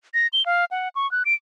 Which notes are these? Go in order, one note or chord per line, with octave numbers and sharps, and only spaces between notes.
A#6
G7
F5
F#5
C#6
F#6
D7